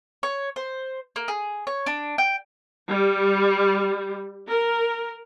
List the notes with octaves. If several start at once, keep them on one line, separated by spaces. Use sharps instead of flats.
C#5
C5
A#3
G#4
C#5
D4
G5
G3
A#4